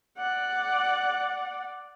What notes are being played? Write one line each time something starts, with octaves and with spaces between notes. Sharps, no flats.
D5 F#5